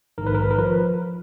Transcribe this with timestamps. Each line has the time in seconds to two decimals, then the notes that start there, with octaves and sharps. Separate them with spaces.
0.18 A#1 G#2 D#3 A#4
0.27 B4
0.34 A#4
0.42 B4
0.51 A#4
0.58 F3 B4